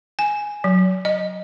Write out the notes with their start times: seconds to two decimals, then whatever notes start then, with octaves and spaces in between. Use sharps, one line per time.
0.19 G#5
0.64 F#3
1.05 D#5